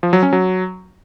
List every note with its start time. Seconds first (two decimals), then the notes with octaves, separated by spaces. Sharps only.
0.03 F3
0.13 F#3
0.23 C#4
0.33 F#3